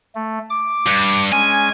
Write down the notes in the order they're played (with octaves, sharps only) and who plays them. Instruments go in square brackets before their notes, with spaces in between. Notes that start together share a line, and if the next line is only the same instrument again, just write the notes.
[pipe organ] A3
D6
[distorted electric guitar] G2
[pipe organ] G#3 C#4 [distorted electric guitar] G#5